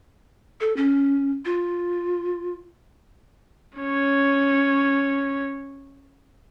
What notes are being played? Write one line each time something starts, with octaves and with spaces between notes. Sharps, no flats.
A4
C#4
F4
C#4 C#5